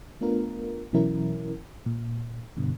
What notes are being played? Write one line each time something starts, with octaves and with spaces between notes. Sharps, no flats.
A3 B3 D4 F4 A#4
B2 E3 F#3 C#4 E4 A#4
A#2
G2 B2 D3